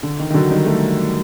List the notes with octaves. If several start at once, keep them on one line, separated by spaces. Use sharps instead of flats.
D3
D#3
D#3
D3 F#3
D#3 G3
F#3 A3